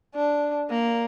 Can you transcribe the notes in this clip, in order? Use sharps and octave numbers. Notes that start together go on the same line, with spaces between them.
D4
A#3